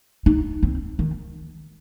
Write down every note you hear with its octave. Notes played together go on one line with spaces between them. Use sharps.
D#4
C4
D#3